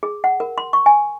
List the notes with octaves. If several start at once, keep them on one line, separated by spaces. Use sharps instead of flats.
G#4
F#5
A#4
C6
C#6
G#5